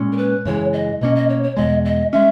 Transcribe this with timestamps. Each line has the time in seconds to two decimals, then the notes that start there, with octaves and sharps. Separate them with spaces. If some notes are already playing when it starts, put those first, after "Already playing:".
Already playing: A#2 G#3 C#4
0.12 A#4
0.17 B4
0.45 F#2 C#3 E3 G#3 C#5
0.73 D#5
1.01 B2 A#3 C#4 D#5
1.15 D#5
1.29 C#5
1.43 C#5
1.57 E2 B2 G#3 D#5
1.85 D#5
2.12 G#3 C#4 E5